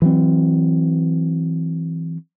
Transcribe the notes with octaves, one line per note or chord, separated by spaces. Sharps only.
E3 F#3 C4